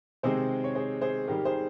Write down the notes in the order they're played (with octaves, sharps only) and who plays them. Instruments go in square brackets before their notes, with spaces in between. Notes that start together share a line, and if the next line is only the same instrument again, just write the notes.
[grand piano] C3 D#3 G#3 C4 G#4 C5
C#5
G#4 C5
G#4 C5
G#2 D#3 G3 G4 A#4
G#4 C5